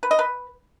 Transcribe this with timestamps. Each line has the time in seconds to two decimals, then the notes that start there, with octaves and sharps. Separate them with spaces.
0.03 B4
0.11 D#5
0.19 B4